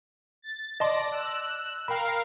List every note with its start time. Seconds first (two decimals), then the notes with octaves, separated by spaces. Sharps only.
0.42 A6
0.80 D5 D#5 A5 C6 A#6
1.12 E6 F#6
1.88 A#4 F5 G5 B5 C7